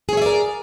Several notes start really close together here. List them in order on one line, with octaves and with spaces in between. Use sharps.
G#4 C#5 E5 D5 A#4